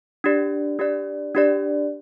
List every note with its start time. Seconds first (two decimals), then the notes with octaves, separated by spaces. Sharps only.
0.24 D4 G4 D5
0.79 D4 G4 D5
1.35 D4 G4 D5